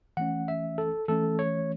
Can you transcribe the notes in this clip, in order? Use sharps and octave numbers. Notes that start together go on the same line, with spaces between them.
E3 A3 C#4 F#5
E5
A4
E3 A3 C#4 A4
C#5